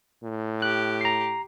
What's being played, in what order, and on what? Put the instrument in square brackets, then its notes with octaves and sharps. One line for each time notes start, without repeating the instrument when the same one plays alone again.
[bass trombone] A2
[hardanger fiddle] G4 [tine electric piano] F#6
[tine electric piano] A#5 C7